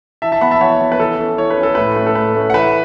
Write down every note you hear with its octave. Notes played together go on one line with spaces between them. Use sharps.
E3 E5 A5
E5 A5
B3 F#5 B5
E5 A5
E3 C#5 F#5
B3
B4
E3 A4
C#4
E3 C#5
B4
C#4
A4
A2 B4
A3 C#4
A4
A2 B4
A3 C#4
F#5
E3 B4 E5